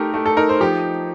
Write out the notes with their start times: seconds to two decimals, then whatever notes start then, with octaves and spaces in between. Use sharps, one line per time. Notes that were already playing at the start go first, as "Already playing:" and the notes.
Already playing: A3 D#4 G4 A#4
0.14 A3
0.26 A4
0.37 D#4 A#4
0.49 C5
0.61 F3 G4